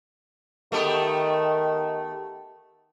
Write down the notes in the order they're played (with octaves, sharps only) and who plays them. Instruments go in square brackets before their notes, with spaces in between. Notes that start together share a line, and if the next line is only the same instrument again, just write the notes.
[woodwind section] D#3 [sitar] A3 B3 G4